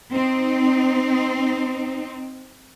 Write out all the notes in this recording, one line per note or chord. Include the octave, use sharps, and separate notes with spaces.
C4 D#4